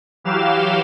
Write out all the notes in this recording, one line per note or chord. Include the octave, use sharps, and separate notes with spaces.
E3 F#3 G4 F5 E7